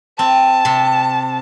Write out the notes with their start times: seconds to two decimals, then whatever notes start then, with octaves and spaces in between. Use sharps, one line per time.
0.19 C4 A5
0.65 C3